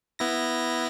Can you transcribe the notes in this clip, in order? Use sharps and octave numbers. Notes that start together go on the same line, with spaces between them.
B3 E4 A#6